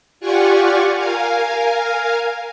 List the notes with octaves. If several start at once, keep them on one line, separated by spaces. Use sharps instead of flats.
F4 G4 D5 F#5 G#5 C#6
A#4 F5 G#5